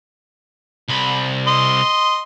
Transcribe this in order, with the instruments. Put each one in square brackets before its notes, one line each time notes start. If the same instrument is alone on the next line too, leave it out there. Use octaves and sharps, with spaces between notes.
[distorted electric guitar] C2 B5
[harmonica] D#5 C6